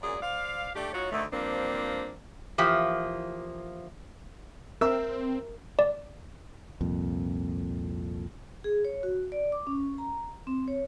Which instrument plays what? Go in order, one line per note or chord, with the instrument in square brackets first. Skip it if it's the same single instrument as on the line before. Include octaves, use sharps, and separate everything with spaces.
[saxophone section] F#2 A#2 G#4 D5
C5 D5 F5
A3 D4 G4
D#4 F4 F#4 C#5
D2 D3 D#3 A3
G2 F3 A#3 C4 D4
[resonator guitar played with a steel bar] E3 F3 A#3 G4
[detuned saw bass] C4 [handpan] A#4 [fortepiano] E5
[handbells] D5
[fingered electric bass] C2 F2 A#2
[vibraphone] G#4
C#5
F#4
D5
D6
C#4
A#5
C4
C#5